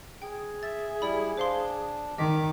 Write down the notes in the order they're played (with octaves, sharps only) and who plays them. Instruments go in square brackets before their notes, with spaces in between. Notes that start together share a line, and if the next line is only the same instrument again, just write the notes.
[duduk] G#4 [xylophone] G5
[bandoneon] E5 [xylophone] A6
[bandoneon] G3 E4 [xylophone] D5 B5
[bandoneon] D4 [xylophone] C5 F5 C6
[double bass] D#3 [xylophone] D#5 B6 [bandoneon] D6